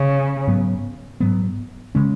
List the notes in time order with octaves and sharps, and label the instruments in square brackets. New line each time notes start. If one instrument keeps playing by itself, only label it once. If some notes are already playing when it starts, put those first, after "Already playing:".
Already playing: [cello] C#3
[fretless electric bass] G#2 F#3 B3
G#2 F#3 B3
C#3 G#3 C#4